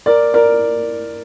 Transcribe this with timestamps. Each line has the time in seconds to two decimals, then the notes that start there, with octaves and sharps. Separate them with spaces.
0.06 A#4 D5
0.34 A#4 D5